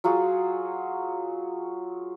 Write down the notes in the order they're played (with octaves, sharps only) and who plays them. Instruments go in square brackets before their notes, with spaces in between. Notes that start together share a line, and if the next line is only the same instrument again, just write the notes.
[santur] F#3 F4 F#4 G#4